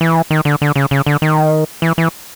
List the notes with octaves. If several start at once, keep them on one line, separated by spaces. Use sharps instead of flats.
E3
D#3
D3
D3
C#3
C#3
D3
D#3
E3
E3